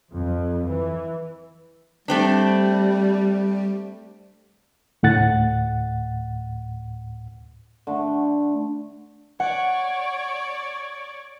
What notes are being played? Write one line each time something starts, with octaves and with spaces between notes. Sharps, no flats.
F2
E3
G3 A3 C4 D4
D2 A2 F#5 A6
D3 A3
C#5 D5 F#5